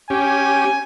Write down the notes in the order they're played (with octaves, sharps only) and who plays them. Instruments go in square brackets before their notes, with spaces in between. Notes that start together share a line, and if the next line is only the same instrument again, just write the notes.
[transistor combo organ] C#4 G4 [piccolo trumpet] G#5